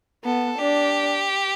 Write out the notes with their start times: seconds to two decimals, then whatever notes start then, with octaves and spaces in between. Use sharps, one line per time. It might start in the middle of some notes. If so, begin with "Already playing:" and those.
0.24 B3 A4
0.58 D4 G4